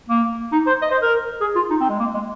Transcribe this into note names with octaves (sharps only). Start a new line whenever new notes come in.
A#3
D#4
C5
D#5
C5
A#4
G#4
F4
D#4
C4
G#3
A#3
G#3